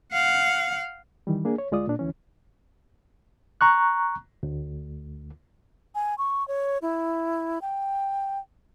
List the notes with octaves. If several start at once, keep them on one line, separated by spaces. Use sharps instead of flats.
F5 F#5
D#3 E3 G3
A#3 D4 G#4
C#5
D2 G#3 F4 D5 D#6
A#2 D4
D2 E3 C#4
A#5 C#6 F#6
D2
G#5
C#6
C#5
E4
G5